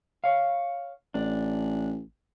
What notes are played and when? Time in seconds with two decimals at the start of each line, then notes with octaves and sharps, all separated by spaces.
0.24 C#5 F5
1.14 A1 D4